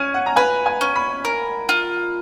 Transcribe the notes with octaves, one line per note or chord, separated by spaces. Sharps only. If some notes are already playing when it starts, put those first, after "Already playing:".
Already playing: C#4 G#5
F#5
A#5
B4 G#5
G#5
C#4
B5
A#4
F4